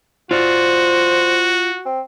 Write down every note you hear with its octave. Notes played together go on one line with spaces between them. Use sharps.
F4 F#4 C5 D5
C4